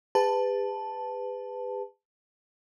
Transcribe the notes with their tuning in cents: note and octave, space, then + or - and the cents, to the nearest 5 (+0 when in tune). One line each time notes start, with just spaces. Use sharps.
G#4 -45 B4 +20 A5 +0